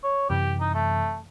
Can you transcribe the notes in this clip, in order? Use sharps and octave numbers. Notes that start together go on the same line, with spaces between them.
C#5
F#2 C3 E3 G4
D#4
A3